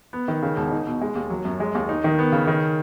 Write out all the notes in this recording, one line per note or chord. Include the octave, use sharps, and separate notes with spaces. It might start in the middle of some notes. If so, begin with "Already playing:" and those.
B3
D#3
C#3
E1
D#4
B2
G#3
D#2
F#3
F#2
G#3
D#2
D#4
D#3
B3
C#3
D#3